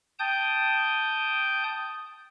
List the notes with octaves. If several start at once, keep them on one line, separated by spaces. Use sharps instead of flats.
G5 A5 D#6 G6